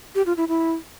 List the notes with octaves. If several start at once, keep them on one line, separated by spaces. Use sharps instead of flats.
G4
F4
E4
E4